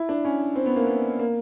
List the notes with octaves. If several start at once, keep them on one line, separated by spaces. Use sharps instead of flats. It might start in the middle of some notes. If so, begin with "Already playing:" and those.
Already playing: E4
D4
C#4
C4
B3
A#3
B3
A#3